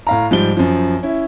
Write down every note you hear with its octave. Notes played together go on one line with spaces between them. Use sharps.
A2 F5 A#5
G#2 F3 G3 G7
F#2 F3
C#4 E4